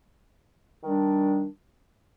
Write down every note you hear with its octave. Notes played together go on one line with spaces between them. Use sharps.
D#3 G3 D4